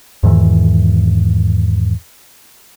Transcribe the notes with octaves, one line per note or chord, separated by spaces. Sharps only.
E2 G#2 D#3 E3